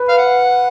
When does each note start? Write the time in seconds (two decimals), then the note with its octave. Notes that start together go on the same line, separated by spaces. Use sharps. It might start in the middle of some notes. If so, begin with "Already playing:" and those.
Already playing: B4
0.08 F5
0.17 F#5